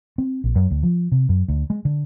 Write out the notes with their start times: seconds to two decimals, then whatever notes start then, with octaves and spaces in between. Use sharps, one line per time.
0.18 C4
0.44 A#1
0.56 F#2
0.71 D2
0.83 F3
1.12 C3
1.29 F#2
1.48 D2
1.70 G#3
1.85 D3